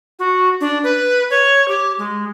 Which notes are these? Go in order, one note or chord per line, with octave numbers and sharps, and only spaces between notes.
F#4
D4
B4
C#5
G4
G#3